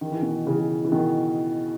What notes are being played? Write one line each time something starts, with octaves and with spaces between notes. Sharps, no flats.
D#3
E3
B2 D#3
C#3 E3
E3
B2 D#3